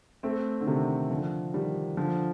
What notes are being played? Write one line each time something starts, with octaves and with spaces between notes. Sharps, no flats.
A3 C4
D3
C3 D#3
D3 F3
D#3 G3
D3 F3